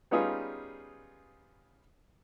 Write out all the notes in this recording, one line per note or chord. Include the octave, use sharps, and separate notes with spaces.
G3 B3 C#4 D#4 F4 G#4